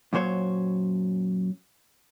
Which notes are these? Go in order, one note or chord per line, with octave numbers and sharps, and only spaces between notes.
F#2 A#2 F#3 C5 C#5